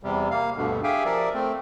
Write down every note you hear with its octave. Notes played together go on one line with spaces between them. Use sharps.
E2 C3 G3
A#3 F5
D2 G2 B2 D3
G4 G#4 E5 F5 G5 G#5
F3 A#4 D5 E5
A3 C4